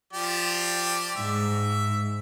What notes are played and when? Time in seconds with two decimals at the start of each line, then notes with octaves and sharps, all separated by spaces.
0.13 F3 G4 D5
1.16 G#2 E5